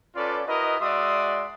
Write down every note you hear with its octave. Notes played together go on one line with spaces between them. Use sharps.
C#4 F4 A4 B4 D5
E4 F#4 A#4 B4 D#5
G#3 F#4 D5 E5 C6 D#6